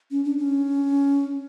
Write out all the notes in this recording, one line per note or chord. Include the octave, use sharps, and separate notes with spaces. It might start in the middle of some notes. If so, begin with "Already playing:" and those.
C#4
D4
C#4